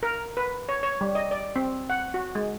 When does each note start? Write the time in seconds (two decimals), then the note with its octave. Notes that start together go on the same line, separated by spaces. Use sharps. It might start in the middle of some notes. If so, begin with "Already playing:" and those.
0.03 A#4
0.37 B4
0.69 C#5
0.83 C#5
1.01 G3
1.15 D#5
1.31 D5
1.56 C4
1.90 F#5
2.14 F#4
2.35 G#3